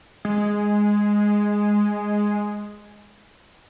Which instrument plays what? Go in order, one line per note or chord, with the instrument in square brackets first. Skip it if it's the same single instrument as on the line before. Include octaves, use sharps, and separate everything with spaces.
[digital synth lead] G#3